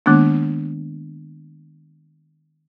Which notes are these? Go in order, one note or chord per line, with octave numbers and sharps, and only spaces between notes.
D#3 G#3 A#3 B3 D4